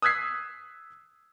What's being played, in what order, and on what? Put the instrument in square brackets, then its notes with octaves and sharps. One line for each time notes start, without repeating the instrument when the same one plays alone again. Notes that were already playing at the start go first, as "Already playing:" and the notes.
[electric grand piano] D#6 E6 F#6 G#6 B6 C7